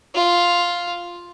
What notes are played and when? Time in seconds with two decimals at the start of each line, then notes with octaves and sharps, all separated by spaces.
0.15 F4